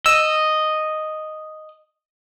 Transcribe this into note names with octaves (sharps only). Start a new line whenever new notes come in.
D#5 E6